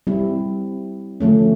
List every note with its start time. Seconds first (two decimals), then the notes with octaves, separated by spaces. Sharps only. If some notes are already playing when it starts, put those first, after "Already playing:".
0.07 G3 C4 E4
1.20 D3 F3 A3 C#4